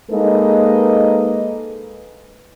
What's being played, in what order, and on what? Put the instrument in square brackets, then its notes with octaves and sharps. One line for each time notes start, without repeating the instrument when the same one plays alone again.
[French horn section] G#3 A#3 D#4 A4 B4 D#5